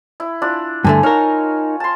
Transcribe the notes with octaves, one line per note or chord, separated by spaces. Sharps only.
E4
D4 E4 F4
G2 D3 A3 G#5 A5
D#4 A#4 C#5 F5
A5 C6